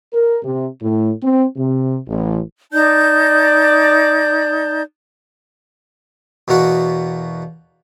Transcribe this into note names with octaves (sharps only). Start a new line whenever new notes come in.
A#4
C3
A2
C4
C3
A1
D#4 D5 A5 G6
E2 B2 A#3 F#4 F#5